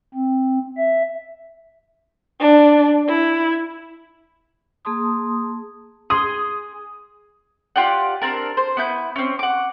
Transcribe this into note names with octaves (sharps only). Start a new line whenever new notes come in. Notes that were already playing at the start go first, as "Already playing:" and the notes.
C4
E5
D4
E4
A#3 G#4 A5 C6 D#6
G#4 C6 D#6
F4 G4 D5 F#5
C4 D4 A#4
C5
B3 E4 G6
C4 C#4
F#5 D6